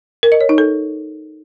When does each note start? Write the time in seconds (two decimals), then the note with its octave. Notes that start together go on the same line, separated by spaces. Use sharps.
0.23 A#4
0.32 D#5
0.41 C#5
0.49 D#4
0.58 A4